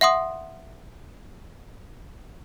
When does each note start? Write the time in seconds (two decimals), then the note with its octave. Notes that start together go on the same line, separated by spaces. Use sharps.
0.01 E5 F#5 C6 D#6